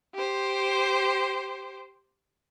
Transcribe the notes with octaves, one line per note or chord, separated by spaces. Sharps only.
G4 C5